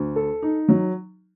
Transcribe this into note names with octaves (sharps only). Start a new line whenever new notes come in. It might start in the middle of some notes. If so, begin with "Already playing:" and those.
Already playing: D2
A4
D#4
F#3